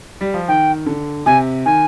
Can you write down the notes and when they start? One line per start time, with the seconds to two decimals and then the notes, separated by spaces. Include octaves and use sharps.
0.21 G3
0.34 F3
0.48 D#3 G5
0.86 D3
1.26 C3 G#5
1.66 D#3 G#5